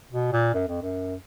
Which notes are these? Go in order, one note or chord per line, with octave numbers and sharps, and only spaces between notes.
B2
A#2
F#2
F2
F#2